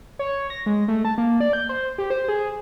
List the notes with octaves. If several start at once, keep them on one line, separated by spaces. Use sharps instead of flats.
C#5
A#6
G#3
A3
A5
A#3
D5
G6
C5
G4
C5
G#4